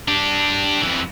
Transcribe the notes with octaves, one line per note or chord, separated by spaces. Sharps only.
D4 G4
F2 E3